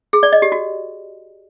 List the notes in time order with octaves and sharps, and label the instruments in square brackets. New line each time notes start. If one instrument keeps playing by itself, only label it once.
[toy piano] G#4
D5
D#5
G4
F#4